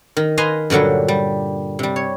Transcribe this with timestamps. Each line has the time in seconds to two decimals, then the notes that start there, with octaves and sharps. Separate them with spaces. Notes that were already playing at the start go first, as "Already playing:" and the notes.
0.17 D#3
0.37 B4 D#5 F5 G#5 A#5 C6
0.70 G2 A#2 D3 F#3 G3
1.08 G3
1.79 C3 G3
1.96 C#5